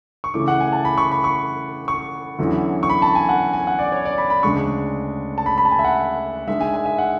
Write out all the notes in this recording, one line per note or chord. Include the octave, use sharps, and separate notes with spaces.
C#6
C#3 E3 A3 E4 D6
F#5
G#5
A5
B5
C#6
B5
C#6
C#6
E2 D3 F#3 C#4 E4
C#6
B5
A5
G#5
F#5
G#5
F#5
D5
C#5
D5
B5
B5
D2 C#3 G#3 D4 C#6
A5
B5
B5
A5
G#5
E5
F#5
G#2 G#3 D4 E5
G#5
G#5
E5
F#5